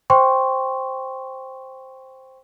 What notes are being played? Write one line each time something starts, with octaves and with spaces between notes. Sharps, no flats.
C5 G5 C6 C#6